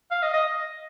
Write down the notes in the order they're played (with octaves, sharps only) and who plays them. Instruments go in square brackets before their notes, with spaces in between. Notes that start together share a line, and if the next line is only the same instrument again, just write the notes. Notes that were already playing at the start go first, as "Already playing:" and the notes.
[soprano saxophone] F5
D#5
D#5